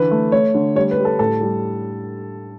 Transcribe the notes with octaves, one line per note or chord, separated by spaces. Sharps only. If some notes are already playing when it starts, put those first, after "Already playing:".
Already playing: D3 E3 B4
A3
A3 C#5
D3
G3 C#5
B4
G3
A4
A2 A4
G3